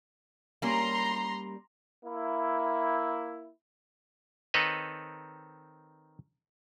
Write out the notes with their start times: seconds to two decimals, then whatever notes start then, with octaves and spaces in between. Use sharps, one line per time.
0.62 G3 A#3 C#4 A#5 C6
2.04 A#3 E4
4.54 D#3 C4 A4 B4 C#5 D#5